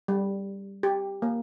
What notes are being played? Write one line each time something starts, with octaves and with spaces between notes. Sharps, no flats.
G3
G4
A#3